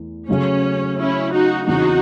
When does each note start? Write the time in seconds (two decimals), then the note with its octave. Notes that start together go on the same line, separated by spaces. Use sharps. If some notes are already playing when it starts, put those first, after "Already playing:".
Already playing: E2 E3 A3
0.29 C#3 F#3 A3 C#4
0.97 C#4 E4
1.33 D#4 F#4
1.67 E2 C#3 E3 C4 D#4 E4 F#4